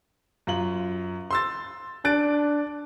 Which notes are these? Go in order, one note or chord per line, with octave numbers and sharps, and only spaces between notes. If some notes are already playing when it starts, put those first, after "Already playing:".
F#2 F4 F#7
C6 E6 A6
D4 F#6 A6 D7